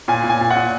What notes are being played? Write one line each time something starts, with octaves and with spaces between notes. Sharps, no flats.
A#2 G#5
A#2
G#5
A#2
F#5
A#2